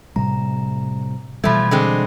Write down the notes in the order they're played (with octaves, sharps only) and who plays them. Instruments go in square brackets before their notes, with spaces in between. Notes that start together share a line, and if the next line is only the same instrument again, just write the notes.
[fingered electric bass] A2 C3 G3 [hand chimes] A#5
[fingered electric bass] B2 E3 G3 [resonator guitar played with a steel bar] F3 A3 [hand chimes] B5 G#6
[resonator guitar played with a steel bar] D3 G#3 C4